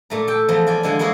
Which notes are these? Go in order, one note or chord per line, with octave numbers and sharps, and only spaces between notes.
A#2 A3 A#5
A4 G5
E2 E3 F3 A#5
F4 D5 G#5
D3 E3 G#3 F4 F#5 G#5
G#3 A#3 E4 F#4 G#4